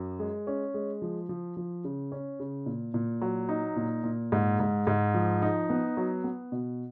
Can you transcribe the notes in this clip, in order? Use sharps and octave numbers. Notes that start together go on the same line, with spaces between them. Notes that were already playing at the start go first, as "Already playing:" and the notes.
Already playing: F#2
G#3
C#4
G#3
F3
F3
F3
C#3
C#4
C#3
A#2
A#2
F#3
D#4
A#2
A#2
G#2
G#2
G#2
F3
D#4
B3
F#3
B3
B2